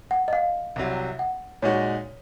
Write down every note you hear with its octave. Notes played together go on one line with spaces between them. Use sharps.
F#5
D#5
F5
C2 C3 F#3
F#5
A#2 G#3 D#4 F#4 C#5